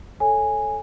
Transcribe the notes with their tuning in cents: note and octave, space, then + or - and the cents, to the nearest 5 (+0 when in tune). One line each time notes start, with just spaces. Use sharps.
A4 +0 C#5 +0 G#5 -5